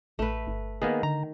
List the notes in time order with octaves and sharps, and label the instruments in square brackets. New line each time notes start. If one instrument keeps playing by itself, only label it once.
[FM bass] A1 [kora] A3 B4
[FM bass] G1
[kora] D#3 [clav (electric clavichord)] A#3 B3 G#4
[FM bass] D3 [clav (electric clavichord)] A#5